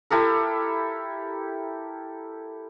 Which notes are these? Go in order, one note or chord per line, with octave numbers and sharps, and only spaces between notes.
E4 G4 A4 A#4